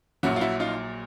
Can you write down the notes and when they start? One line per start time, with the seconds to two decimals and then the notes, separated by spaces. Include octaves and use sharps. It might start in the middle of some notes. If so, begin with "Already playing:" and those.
0.23 A#1 A#2 F#3 E4 F#4
0.36 F4
0.41 E4 F#4
0.60 D#4 F4